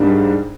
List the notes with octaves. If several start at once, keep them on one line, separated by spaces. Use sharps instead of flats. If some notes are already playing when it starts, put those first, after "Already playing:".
Already playing: G#2 G3 A#3 D4